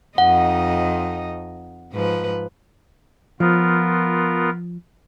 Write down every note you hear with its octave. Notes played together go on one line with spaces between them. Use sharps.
F2 D#4 D#5 F#5
G#2 F3 B4
F3 B3 F4 A#4